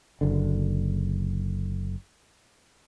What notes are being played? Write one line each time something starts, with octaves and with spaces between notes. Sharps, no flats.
F#1 D3